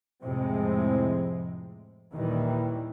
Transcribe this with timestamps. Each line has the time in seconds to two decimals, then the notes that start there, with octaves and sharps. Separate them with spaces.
0.22 F2 A2 C3 F3 G#3 C4
2.12 D#2 A#2 D#3 E3 G3